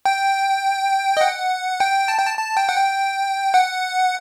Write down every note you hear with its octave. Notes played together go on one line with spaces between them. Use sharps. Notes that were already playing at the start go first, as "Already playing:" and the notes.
G5
D#5
F#5
G5
A5
G5
A5
A5
G5
F#5
G5
F#5